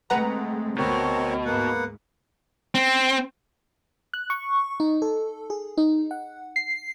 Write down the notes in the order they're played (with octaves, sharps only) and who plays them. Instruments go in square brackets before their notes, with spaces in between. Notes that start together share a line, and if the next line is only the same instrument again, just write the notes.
[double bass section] G#3 A3 C4 [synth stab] B4 F#5 A#5
[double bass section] D2 [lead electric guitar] B2 [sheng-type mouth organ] C4 A#4 C#5
[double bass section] G#2 [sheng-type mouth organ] A#3 B3 F#5
[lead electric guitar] C4
[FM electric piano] F#6
C#6
D#4
A4
G#4
D#4
F#5
C7